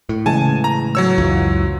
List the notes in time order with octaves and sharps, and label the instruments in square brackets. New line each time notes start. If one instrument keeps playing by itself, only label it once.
[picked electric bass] A2
[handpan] C#3 E3 G#3 [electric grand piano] G#5 A5
[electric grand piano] A#5
F#3 C#5 E6
[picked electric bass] C#2 F#2 E3 [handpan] F4